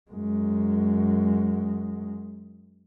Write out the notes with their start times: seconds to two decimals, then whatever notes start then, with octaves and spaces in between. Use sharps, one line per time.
0.11 F#2 G#3